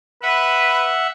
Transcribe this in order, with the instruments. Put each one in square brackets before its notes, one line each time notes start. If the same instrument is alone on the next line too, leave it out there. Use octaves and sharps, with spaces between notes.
[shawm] B4 [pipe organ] E5 F#5